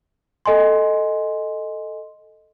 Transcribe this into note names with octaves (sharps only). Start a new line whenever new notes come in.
A4 D#5 G#5 C6